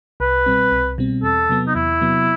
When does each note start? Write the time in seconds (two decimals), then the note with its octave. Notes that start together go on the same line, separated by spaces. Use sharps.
0.20 C2 B4
0.46 B2 G3 C4
0.72 C2
0.98 B2 G3 C4
1.23 E2 A4
1.49 C3 F#3 B3
1.67 D#4
1.75 E2 E4
2.01 C3 F#3 B3